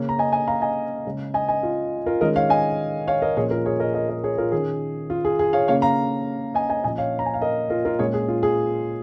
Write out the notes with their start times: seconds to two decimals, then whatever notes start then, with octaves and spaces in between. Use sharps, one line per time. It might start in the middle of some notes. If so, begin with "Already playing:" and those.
Already playing: C#3 A#3 C#4
0.09 A#5
0.19 D#5 G#5
0.32 D#5 G#5
0.47 F5 A#5
0.62 D#5 G#5
1.05 C#3 G#3 C#4
1.34 D#5 G#5
1.48 D#5 G#5
1.63 F4
2.06 F4 A#4
2.21 D#3 G#3 C#4 A#4 D#5
2.36 C#5 F5
2.49 D#5 G#5
3.07 C#5 F5
3.22 A#4 D#5
3.37 A#2 F3 C#4 G#4 C#5
3.51 F4 A#4
3.66 G#4 C#5
3.80 A#4 D#5
3.94 A#4 D#5
4.09 A#4 D#5
4.24 G#4 C#5
4.38 F4 A#4
4.52 D#3 C#4 G#4
5.10 F4
5.25 G#4
5.39 G#4
5.53 C#5 F5
5.68 C#3 A#3 C#4 C#5 F5
5.82 F5 A#5
6.54 D#5 G#5
6.69 D#5 G#5
6.84 A#2 F3 A#3 C#4 D#5 G#5
6.98 C#5 F5
7.19 A#5
7.26 G#5
7.34 F5
7.42 A#4 D#5
7.70 F4 A#4
7.85 F4 A#4
7.99 A#2 G#3 C#4 G#4 C#5
8.14 G#4
8.28 F4
8.43 G#4